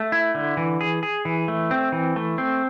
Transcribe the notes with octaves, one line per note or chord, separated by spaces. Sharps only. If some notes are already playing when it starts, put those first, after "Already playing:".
Already playing: A3
E4
D3
E3
G#4
G#4
E3
A3
C4
E3
A3
C4